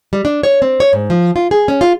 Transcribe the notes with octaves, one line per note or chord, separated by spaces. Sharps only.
G3
D4
C#5
C4
C#5
G#2
F3
F4
G#4
C#4
F4